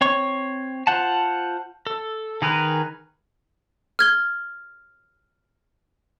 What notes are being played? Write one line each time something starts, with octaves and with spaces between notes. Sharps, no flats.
C4 C#5 C#6
F4 C5 F#5 A5
A4
D#3 G#4 A#4 B4
F6 G#6 G7